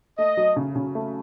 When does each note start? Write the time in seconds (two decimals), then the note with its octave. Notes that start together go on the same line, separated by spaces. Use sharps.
0.18 A3 D#5
0.37 F#3
0.56 C#3
0.76 C#3
0.95 A3